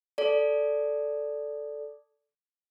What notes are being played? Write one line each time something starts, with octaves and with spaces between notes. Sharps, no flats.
A4 D5